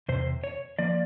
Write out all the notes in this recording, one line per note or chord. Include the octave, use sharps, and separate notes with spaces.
E2 C3 C5
C#5
F3 A#3 D5